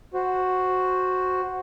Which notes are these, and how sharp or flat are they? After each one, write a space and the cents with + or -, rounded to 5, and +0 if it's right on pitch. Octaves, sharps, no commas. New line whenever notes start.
F#4 +0 C5 +0